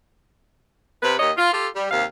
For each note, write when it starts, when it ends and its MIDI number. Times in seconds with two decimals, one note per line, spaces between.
1.03 1.14 48
1.03 1.14 71
1.19 1.31 39
1.19 1.31 63
1.19 1.31 73
1.19 1.31 75
1.37 1.52 65
1.53 1.67 65
1.53 1.67 67
1.53 1.67 69
1.75 1.86 55
1.90 2.04 39
1.90 2.04 48
1.90 2.04 77